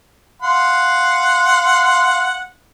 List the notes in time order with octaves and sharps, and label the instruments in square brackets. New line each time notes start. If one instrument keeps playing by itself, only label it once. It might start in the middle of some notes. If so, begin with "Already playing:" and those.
[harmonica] F5 F#5 C6